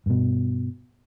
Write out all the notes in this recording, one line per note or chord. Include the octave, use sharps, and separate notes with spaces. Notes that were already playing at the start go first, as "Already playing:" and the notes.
G2 B2